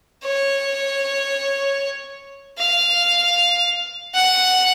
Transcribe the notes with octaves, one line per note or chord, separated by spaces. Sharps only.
C#5
F5
F#5